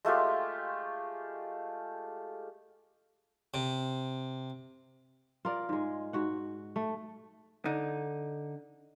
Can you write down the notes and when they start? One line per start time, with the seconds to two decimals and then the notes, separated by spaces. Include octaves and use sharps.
0.05 G#3 A3 F4 G4
3.54 C3
5.45 F4 A#4 D5
5.69 G#2 G#3
6.13 G#2 F#4 F#5
6.76 A3
7.65 D3 D#4